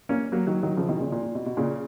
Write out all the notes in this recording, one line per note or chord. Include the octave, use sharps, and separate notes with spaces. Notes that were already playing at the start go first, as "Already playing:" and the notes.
A#3 C#4
F#3 A#3
D#3 F#3
D#3 F#3
C#3 F3
B2 D#3
A#2 C#3
A#2
A#2
B2
B2
A#2 C#3